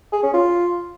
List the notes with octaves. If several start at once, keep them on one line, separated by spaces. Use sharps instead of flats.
G#4
C#4
F4